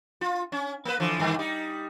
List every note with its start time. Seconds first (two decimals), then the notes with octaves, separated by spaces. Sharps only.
0.21 F4
0.52 C#4
0.85 A#3 B4
1.00 D3 E3 F3
1.19 G2 D#3 E3
1.39 G3 D#4